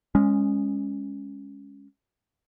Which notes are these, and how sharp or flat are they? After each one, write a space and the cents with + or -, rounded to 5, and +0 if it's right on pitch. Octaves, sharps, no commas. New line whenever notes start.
G#3 -15 C#4 +0